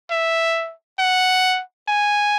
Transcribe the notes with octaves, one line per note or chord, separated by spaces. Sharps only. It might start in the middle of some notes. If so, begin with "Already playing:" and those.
E5
F#5
G#5